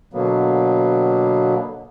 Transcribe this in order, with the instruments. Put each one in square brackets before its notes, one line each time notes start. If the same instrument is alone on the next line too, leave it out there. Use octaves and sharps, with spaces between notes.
[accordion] B2 D3 F#3 A#3 B3